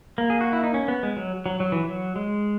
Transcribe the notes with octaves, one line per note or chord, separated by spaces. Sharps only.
A#3
G#4
F#4
E4
D#4
C#4
B3
G#3
F#3
F#3
F#3
E3
F#3
G#3